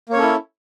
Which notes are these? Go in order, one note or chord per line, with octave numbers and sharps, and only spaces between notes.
A#3 C#4 E4 A4 C#5